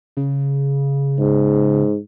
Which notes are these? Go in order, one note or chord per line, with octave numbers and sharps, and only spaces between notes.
C#3
G#2